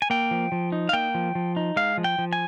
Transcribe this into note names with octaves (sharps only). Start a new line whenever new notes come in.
G#5
A#3 G5
F3
F3
D#4
F5
A#3 G5
F3
F3
D#4
G#3 F5
F3
G5
F3
G#5